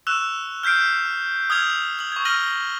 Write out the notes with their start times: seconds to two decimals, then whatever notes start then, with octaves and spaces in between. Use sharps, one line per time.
0.07 C#6 E6 F#6 E7 F7 G7
0.63 F6 G6 B6 C7 D7
1.50 D#6 F6 G#6 F7
1.99 D#6 F#7
2.12 C#6 G#6
2.25 E6 F6 A#6 D#7 F#7 G7